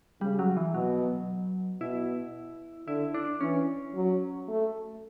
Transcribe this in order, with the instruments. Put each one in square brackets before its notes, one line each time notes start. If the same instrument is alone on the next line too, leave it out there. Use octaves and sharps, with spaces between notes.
[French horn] C#3 [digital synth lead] G3
[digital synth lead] F#3
E3
[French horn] B2 [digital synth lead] F#3
[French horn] B2 [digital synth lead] E4
[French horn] D3 [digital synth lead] E4
[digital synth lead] D4
[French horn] E3 [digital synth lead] C#4
[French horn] F#3
A3